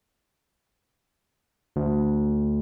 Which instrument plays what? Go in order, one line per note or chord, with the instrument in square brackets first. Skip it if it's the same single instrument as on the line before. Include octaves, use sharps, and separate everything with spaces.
[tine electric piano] D2